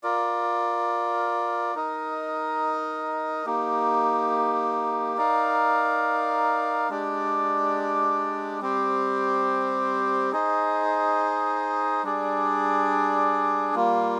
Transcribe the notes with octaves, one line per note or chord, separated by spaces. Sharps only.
F4 A#4 D5
D#4 A#4 D#5
A#3 D#4 G4
D#4 A#4 D5 F5
G#3 D4 G4 D5
G3 C4 G4 C5
D#4 G#4 C5 D#5
G3 D4 G#4 D5
G3 A#3 F4